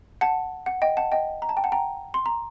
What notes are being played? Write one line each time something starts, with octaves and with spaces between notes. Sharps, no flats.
F#5 A5
F#5
D#5 G5
F#5 A5
D#5 G5
A#5
A5
G5
F#5 A5
G5 A#5
C6
A#5